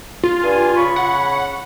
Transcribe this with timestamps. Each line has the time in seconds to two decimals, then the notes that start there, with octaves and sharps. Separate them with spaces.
0.24 F4
0.42 G2 G#5
0.77 C#3 B5 C#6
0.96 F#5